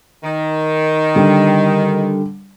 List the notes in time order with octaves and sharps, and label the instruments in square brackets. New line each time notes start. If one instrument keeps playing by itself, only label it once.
[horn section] D#3
[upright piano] D3 G3